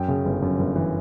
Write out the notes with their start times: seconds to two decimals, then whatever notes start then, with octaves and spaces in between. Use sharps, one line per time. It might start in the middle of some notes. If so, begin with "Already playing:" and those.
Already playing: F#2 G5
0.08 C#3
0.25 G1
0.42 F#2
0.59 G1
0.76 E3